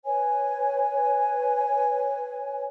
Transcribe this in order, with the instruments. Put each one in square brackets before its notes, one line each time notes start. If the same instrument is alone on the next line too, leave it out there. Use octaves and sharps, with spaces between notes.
[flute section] B4 C#5 G#5